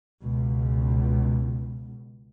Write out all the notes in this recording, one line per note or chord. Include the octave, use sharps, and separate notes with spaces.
C#2 B2